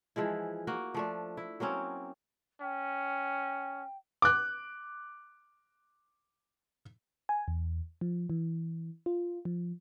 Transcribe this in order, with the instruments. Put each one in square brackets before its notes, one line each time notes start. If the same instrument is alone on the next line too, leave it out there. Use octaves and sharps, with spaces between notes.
[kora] E3 F3 G#3 E4
A#3 F#4
F3 A3 D4
E4
F#3 A#3 C4 C#4
[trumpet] C#4 [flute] G5
[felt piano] D6 F#6
[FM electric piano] G#5
E2
F3
E3
F4
F3